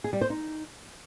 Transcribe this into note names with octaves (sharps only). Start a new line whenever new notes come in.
G#4
G3
C5
D#4